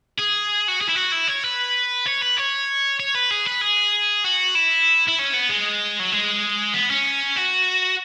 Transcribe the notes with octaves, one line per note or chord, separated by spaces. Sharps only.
G#4
F#4
G#4
E4
F#4
E4
C#5
B4
C#5
B4
C#5
C#5
B4
G#4
B4
G#4
F#4
E4
E4
C#4
B3
G#3
F#3
G#3
B3
C#4
F#4